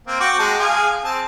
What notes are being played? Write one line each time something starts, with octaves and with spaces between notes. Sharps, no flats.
A#3 C4
F#4 G5 D6
G#3 A5
G#4 F5
C4 A5